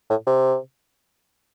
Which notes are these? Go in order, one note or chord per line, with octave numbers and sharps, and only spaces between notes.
A2
C3